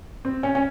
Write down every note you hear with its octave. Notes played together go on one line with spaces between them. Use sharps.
C4
C#4
C#4